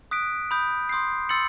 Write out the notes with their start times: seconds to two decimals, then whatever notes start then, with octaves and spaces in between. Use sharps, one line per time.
0.11 D#6 F#6 B6 D7
0.51 B5 D#6 G6
0.89 C6 D#6 G6 C7
1.29 C6 E6 A6 C#7 F#7